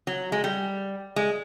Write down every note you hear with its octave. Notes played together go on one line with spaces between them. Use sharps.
F#3
G#3
G3
G#3